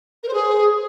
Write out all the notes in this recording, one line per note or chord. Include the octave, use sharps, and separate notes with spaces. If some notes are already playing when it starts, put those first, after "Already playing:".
A#4
C5
G#4